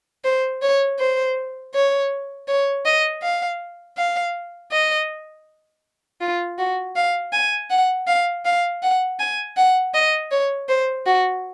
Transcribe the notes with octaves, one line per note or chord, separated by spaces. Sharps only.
C5
C#5
C5
C#5
C#5
D#5
F5
F5
D#5
F4
F#4
F5
G#5
F#5
F5
F5
F#5
G#5
F#5
D#5
C#5
C5
F#4